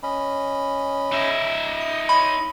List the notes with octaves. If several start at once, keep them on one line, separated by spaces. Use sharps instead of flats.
C#4 D#5 B5
D#4 E5
D#6
C#5 D#5 B5 C6